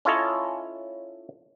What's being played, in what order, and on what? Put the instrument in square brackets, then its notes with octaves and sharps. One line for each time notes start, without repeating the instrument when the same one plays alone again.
[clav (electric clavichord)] C#4 E4 F4 A4 C#5 D#5